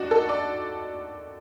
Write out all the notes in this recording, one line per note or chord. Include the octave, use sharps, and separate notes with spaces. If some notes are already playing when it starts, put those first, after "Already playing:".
Already playing: D#2 D4 D#4 F#4
A4
D5